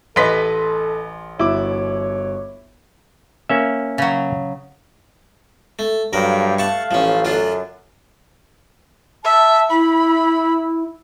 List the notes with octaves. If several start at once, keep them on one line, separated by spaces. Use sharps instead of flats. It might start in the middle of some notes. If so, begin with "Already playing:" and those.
A1 A4 B4 D#5 C6 B6
G1 E4 F#4 C#5 D6
A#3 C#4 E5
C#3 F#3
A3
G2 F#3 A3 A#4 F5
F#5 A5 C#6
A1 F3 C#4
F#2 D3 D4 F4
E5 A5
E4 B5